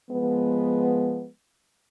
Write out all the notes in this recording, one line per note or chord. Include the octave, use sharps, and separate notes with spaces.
F3 G#3 B3